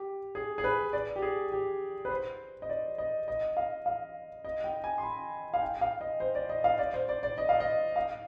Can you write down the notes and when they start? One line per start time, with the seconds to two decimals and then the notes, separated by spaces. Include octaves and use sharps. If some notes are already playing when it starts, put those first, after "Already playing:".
Already playing: G4
0.35 G#4
0.58 G#4
0.64 B4
0.93 D5
1.16 G4
1.22 G#4
1.52 G4
2.05 B4
2.10 C5
2.62 D#5
2.69 D5
2.98 D#5
3.28 D#5
3.57 F5
3.86 F5
4.45 D#5
4.64 G5
4.84 G#5
4.98 C6
5.03 B5
5.54 F5
5.62 G5
5.81 F5
6.01 D#5
6.20 C5
6.35 D5
6.49 D#5
6.64 F5
6.79 D5
6.94 C5
7.09 D5
7.23 D5
7.38 D#5
7.49 F5
7.60 D#5
7.96 F5